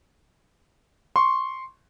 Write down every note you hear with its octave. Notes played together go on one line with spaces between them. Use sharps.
C6 C#6